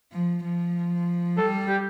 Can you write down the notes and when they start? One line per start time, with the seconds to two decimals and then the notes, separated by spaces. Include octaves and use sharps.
0.13 F3
0.44 F3
1.37 G3 A4
1.68 G4